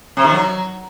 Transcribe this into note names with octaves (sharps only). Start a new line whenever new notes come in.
C3
D#3
F#3